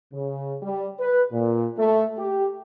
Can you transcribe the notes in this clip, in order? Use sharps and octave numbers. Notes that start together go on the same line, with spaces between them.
C#3
G3
B4
A#2
A3
G4